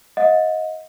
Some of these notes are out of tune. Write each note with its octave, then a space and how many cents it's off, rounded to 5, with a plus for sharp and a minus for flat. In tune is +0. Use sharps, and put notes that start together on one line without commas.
D#5 +20 F#5 -45